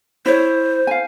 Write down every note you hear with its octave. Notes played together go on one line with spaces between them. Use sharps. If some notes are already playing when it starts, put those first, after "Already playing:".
E4 C5 C#5
F5 G#5